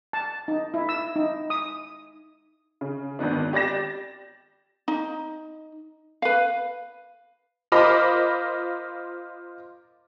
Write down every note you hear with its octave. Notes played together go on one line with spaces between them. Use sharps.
A5
D#4
E4
E6
D#4
D#6
C#3
G#1 D#3 B3 D4
G4 D5 A6 A#6 E7
D#4
B4 F5
F4 A#4 C5 D#5 B5 D6